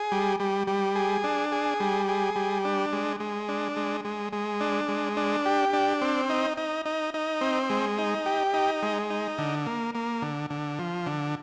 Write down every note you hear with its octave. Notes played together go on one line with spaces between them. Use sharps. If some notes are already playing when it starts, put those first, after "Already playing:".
Already playing: G#4
G3
G3
G3
G#4
D4
G#4
G3
G#4
G3
D4
G#3
G#3
D4
G#3
G#3
G#3
D4
G#3
D4
G4
D4
C4
D#4
D#4
D#4
D#4
C4
G#3
D#4
G4
D#4
G#3
D#4
D3
A#3
A#3
D3
D3
F3
D3